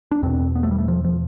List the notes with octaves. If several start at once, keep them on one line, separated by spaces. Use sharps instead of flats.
D4
E2 B2 C4
B3
A3
G3
A3
F3
F3